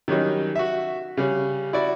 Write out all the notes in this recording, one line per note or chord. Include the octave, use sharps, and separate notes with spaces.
D#3 F#3 G3 C#4 D#4
F#4 E5
C#3 G3 C#4
E4 F#4 D5